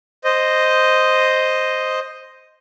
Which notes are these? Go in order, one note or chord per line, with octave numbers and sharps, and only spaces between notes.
C5 D#5